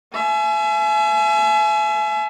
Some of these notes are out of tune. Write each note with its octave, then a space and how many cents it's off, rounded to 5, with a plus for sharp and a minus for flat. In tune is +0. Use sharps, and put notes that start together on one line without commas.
E5 +35 G#5 +40